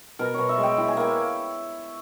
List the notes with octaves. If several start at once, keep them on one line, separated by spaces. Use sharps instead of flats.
B2 A#4
B2 C#5
E5
G#3
G5
E4 G5
G#5
A#3 G5